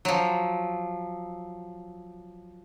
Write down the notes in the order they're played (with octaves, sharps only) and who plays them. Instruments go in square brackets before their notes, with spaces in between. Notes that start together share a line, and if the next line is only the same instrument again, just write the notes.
[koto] F3 F#3